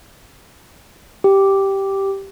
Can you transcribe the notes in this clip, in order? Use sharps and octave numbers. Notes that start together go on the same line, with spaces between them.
G4